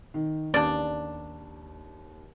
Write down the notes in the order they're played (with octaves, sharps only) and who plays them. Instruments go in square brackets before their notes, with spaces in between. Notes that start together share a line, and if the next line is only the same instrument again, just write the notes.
[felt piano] D#3
[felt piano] D#2 [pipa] C#3 D4 [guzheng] D5